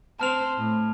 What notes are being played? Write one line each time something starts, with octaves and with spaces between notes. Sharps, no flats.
C4 C5 A5 F6 F7
A2